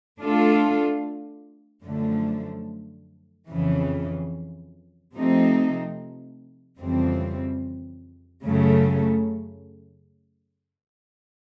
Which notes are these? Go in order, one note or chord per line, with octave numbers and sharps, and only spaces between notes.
A3 D4 F4 A4
F#2 D3 F3 A3
F2 C#3 E3
C3 F3 A3 C4 D#4
F2 C#3 E3 G3 C4
F#2 C#3 F#3 A3